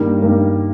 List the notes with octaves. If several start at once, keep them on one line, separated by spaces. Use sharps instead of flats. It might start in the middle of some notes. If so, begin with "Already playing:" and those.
Already playing: G2 D#3 G3 A#3
G2 D#3 G3 A#3